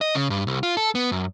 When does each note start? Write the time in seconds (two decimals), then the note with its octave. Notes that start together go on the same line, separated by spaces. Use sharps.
0.01 D#5
0.15 C#3
0.30 G2
0.47 C2
0.63 F4
0.77 A4
0.95 B3
1.12 F#2